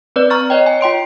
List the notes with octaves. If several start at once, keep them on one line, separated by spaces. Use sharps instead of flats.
C4 B4 D5
A#5 C#6 F6 A6
C#5 D#5 G5
G#5
F4 G5 C6 D7